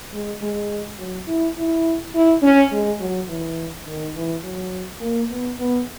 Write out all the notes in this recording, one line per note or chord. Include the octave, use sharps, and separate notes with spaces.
G#3
G#3
F#3
E4
E4
E4
C#4
G#3
F#3
E3
D#3
E3
F#3
A#3
B3
B3